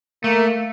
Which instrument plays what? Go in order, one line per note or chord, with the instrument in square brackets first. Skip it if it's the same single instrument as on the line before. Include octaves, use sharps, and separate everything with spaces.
[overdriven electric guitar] A3 [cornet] A#3